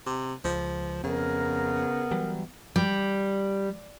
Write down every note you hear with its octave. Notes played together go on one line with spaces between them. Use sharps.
C3
C#2 F3
F2 C#3 B3 A#4
E3 F#3 G3
G3